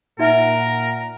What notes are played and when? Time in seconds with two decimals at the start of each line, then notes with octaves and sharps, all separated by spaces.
0.19 A#2 D#4 A#4 E5 F#5